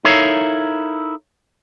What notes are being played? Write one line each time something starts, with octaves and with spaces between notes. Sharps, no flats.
D#4 E4 A4 A#4 C#5 F5